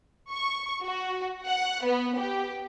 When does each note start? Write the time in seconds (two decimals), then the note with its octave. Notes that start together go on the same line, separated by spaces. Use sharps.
0.29 C#6
0.84 F#4
1.44 F#5
1.84 B3
2.18 G4